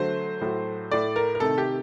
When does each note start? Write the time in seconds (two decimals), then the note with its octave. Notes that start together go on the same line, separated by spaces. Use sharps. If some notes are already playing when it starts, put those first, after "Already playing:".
Already playing: D3 F#3 A3 C5
0.41 A2 F#3 A3
0.91 A2 A3 D5
1.16 A#4
1.35 A#4
1.40 C3 D#3 A3 A4
1.58 G4